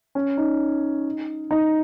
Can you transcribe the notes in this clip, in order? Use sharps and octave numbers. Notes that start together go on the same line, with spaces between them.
C#4
D#4
D#4